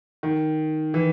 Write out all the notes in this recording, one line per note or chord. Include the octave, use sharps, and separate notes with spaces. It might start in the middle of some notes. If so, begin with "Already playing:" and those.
D#3
E3